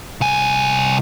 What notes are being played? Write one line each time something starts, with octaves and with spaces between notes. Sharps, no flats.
C2 G#5